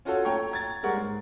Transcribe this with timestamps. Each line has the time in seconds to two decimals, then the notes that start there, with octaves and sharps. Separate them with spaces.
0.05 C#4 F4 F#4 A4 C#5
0.25 A3 C#5 G5 A#5 C#6
0.51 A#5 G#6 A6
0.83 G3 G#3 A#4 F#5 C#6
0.96 G#2